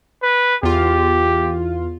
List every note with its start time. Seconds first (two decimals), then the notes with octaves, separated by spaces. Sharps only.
0.22 B4
0.63 E2 F4 G4